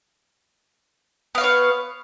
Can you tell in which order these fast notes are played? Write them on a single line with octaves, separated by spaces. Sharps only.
B3 F5 C#5 B4